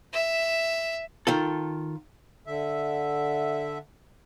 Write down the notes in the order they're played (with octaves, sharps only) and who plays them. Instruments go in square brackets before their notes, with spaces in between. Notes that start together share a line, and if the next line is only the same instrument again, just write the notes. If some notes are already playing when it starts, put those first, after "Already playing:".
[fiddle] E5
[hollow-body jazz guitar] D#3 F4 A4
[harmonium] D3 E5